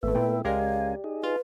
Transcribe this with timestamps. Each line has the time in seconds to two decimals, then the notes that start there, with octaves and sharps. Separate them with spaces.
0.03 G#1 A2 A3 B3 B4 E5
0.15 A#2 E4 A4 G5
0.45 C#2 G#3 C#4 G4 A#4 D5 F5 G#5
1.04 D#4 G#4
1.23 F4 B4